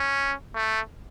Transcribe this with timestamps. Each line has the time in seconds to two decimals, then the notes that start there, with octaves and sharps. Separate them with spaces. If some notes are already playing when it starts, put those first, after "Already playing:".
Already playing: C#4
0.55 A3